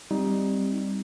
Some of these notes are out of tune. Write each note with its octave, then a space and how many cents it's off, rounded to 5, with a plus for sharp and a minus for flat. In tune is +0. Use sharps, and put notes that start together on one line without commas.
G3 +5 C4 +0 D#4 +10